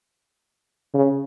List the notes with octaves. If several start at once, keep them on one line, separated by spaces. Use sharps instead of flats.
C#3